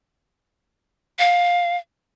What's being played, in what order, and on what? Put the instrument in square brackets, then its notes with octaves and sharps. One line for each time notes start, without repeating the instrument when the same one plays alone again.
[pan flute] F5